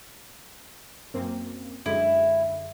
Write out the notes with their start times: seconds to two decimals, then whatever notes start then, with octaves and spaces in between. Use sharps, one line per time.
1.14 F#2 A#3 C4
1.86 F#2 D3 G#3 E4